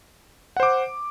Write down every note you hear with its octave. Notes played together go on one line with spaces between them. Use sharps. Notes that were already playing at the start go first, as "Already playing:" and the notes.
C5 F#5 D6